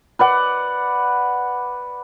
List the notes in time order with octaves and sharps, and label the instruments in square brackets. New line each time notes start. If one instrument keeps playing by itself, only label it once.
[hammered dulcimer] B4 D5 F#5